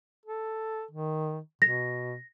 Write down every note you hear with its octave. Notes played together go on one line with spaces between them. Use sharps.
A4
D#3
B2 A#6